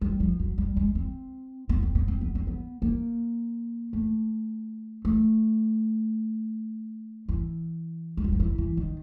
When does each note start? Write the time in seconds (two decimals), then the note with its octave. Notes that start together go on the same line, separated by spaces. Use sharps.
0.01 G3
0.20 F3
0.39 F#3
0.58 G3
0.77 G#3
0.95 C4
1.69 B3
1.83 C4
1.95 B3
2.08 C4
2.21 B3
2.35 C4
2.47 B3
2.82 A#3
3.93 A3
5.05 A3
7.29 E3
8.17 G3
8.24 F#3
8.32 F3
8.40 E3
8.58 E3
8.77 D#3